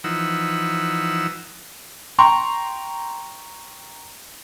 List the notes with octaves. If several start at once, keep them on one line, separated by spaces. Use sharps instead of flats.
E3 F3 D#4 F#5 E6
G5 A#5 C6 C#6